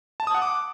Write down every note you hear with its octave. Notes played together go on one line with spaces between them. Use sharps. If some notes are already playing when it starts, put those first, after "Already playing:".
A5
D#6
F#5
D6